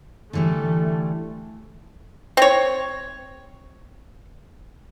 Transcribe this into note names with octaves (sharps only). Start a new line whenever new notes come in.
D3 E3 G3 A3
C4 C#5